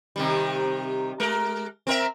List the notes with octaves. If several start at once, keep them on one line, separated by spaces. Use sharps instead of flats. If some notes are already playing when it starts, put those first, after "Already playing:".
C3 D#3 G3
G#3 A#4
C4 A#4 E5